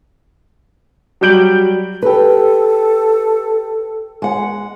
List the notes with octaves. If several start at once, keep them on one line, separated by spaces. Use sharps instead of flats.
F#3 G3 G6 D7 F#7
G4 A4 B4
G#3 F#5